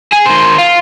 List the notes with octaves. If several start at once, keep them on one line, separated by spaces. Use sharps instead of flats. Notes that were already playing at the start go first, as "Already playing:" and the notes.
G#4
D#3 C5
F4